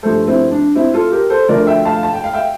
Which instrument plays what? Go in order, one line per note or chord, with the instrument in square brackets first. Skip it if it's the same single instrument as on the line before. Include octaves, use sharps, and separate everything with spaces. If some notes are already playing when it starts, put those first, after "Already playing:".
[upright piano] G2 F3 A3 A4 C5
C4 E4
D4
C4 E4
F4 A4
G4 A#4
A4 C5
D2 D3 F3 A3 A#4 D5
E5 G5
F5 A5
A5
G5
F5
E5 G5